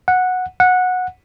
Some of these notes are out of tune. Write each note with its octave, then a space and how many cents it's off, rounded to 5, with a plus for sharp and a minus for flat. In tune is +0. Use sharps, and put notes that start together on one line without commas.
F#5 -10
F#5 -15